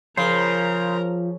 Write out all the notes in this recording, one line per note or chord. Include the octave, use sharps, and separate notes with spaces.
C#3 F3 A#4 C5 A#5